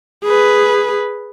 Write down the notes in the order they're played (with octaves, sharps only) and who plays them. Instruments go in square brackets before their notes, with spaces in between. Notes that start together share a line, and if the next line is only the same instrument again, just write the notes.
[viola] G#4 B4